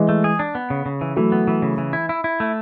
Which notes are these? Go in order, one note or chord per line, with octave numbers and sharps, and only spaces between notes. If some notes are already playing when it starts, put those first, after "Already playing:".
Already playing: E3 G#3
A3
G#4
D4
B3
C#3
C#3
E3
E3 F#3 A3
B3
E3
C#3
E3
E4
E4
E4
A3